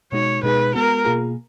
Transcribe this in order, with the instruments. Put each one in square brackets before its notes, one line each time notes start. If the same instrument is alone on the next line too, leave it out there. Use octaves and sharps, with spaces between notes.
[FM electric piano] B2 G#3 D#4 F#4 [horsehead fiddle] C#5
[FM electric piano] B2 G#3 D#4 G#4 [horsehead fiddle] B4
[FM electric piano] G#3 B3 F#4 [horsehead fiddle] A#4
[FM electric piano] B2 A#3 F4 G#4